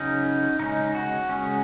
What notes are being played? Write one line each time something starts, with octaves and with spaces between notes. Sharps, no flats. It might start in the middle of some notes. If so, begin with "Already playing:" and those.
Already playing: C#3 F#3 C#4 D#4
C#3 G#3 C#4 D#4
F#4
C#3 G#3 C#4